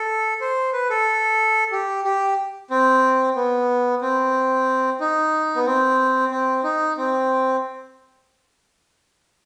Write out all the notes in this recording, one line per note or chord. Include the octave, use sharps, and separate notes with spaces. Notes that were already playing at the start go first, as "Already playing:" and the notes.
Already playing: A4
C5
B4
A4
G4
G4
C4
B3
C4
D#4
B3
C4
C4
D#4
C4